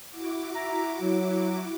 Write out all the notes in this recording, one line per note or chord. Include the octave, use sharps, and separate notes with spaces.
E4 F#4 D6
E5 A#5
F#3